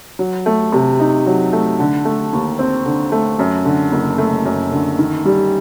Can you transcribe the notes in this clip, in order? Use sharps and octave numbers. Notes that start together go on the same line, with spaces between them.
F#3
A3
C3
D#4
F#3
A3
D3
A3
D#2
C4
D3
A3
F#2
D3
F#1
A3
F#2
D3
D#3
G3